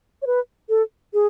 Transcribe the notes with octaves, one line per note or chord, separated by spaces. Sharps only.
C#5
B4
A4
G#4